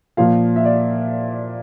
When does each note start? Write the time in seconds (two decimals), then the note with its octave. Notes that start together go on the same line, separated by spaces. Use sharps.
0.17 A#2 F3 F5
0.56 E5
0.65 D5